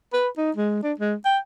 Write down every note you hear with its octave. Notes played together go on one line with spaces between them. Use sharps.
B4
D#4
G#3
D4
G#3
G5